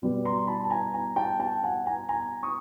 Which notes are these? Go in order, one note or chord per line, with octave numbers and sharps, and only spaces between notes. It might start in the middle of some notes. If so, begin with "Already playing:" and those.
B2 G3 B3
A#5 C6
A5 B5
A5
G#5 A#5
G#5 A#5
G5 A5
G5 A5
F#5 G#5
G#5 A#5
G#5 A#5
C#6 D#6